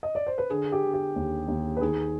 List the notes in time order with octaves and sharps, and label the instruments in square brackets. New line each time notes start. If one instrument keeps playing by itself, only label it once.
[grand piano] D#5
D5
C5
B4
D3 G#4
G4
D3
G4
D#2
D#2
B4
D#3 G#4